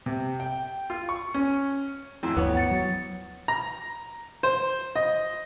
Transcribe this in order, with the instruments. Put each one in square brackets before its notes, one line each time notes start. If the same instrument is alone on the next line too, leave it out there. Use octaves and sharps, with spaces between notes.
[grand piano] C3
G5
F4
C#6
C#4
[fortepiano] F2 A2 [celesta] E4
[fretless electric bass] D2 G2 F3 [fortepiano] B3 C#5
[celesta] F#5 A6 C#7
[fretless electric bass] F#3
[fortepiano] A#5
C5
D#5